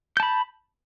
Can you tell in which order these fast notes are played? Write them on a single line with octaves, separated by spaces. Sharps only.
G6 A5 B5